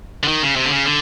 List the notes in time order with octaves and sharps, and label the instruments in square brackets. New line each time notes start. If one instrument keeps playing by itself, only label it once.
[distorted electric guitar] D3
D#3
C#3
C3
D3
C#3
D3